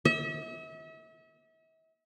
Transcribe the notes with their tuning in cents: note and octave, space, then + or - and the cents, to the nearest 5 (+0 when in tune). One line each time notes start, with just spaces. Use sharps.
E5 -40